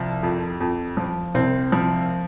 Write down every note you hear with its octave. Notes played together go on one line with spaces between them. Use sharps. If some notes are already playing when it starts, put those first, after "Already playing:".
Already playing: C2 F3
F2
F2
F3
C2 C4
F3